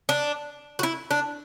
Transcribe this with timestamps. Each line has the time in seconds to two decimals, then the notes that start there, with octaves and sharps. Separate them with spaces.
0.09 D4
0.79 F#4
0.83 E4
1.11 D4